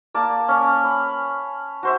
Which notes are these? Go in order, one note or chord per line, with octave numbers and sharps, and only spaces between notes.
A#3 D5 A5
C#4 C#5
B5
F#4 C5 E5